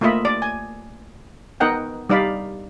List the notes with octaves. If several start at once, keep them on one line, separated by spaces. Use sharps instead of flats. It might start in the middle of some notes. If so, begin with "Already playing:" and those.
A3 A#3 F4 D#5 E5 B5
D5
G#5
B3 D#4 A#4 D#5 F#5 G5
G3 D#4 D5 F5 B5